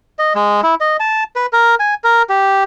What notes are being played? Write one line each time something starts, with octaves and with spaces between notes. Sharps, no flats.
D#5
G#3
E4
D#5
A5
B4
A#4
G#5
A#4
G4